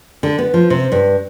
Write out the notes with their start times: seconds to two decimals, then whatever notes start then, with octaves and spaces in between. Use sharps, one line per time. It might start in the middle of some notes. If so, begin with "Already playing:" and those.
0.23 D3
0.38 B3
0.54 F3
0.70 C3
0.92 G2